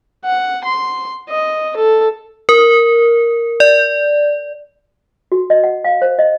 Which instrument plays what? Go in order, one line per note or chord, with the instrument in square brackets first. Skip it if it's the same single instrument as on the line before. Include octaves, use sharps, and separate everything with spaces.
[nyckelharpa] F#5
C6
D#5
A4
[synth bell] A#4
D5
[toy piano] F#4
D#5
F#5
F5
C5
D#5